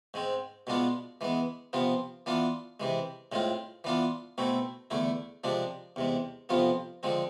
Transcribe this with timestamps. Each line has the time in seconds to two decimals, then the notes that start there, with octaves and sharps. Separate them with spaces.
0.14 G#2 G#3 C4
0.67 B2 G#3 B3 D4 F4
1.21 E3 G#3 B3
1.73 C3 F3 B3 F4
2.26 E3 B3 D4 F4
2.80 C3 E3 G#3
3.32 A2 G#3 C4 F4
3.84 E3 B3 D4 F4
4.38 B2 A3 C4 E4
4.91 E2 D3 A3 E4
5.44 C3 F3 G#3 D4
5.96 E2 C3 G#3
6.49 F2 C3 F3 B3 F4
7.03 D3 F3 G#3 C4